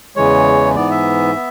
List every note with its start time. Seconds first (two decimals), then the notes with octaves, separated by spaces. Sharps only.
0.16 E2 C#3 E3 G#3 C#5
0.76 G#2 E3 B3 D5
0.91 E5
1.35 B3